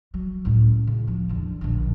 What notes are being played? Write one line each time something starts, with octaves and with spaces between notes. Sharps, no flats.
F#3
C#2 A2
C#3
F3
E2 D3
A#1 D3